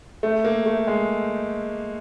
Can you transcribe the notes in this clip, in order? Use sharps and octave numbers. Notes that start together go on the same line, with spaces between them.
A3
A#3
A3
G#3